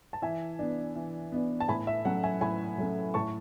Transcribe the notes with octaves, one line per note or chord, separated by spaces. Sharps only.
A5
E3 E5 G#5
B3 D4
E3
B3 D4
A5
A2 G#5 B5
E5
F#3 A3 C#4 F#5
E5 G#5
A2 G#5 B5
F#3 A3 C#4
A2 A5 C#6